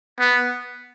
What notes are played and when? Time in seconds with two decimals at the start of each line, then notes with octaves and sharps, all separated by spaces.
0.19 B3